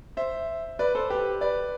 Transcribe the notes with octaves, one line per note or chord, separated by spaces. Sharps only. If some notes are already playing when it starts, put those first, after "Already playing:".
C5 E5
B4 D5
A4 C5
G4 B4
B4 D5